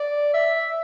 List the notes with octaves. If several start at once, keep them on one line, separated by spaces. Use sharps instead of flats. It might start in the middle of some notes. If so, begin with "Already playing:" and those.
Already playing: D5
E5